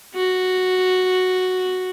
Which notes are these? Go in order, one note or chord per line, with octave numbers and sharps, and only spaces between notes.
F#4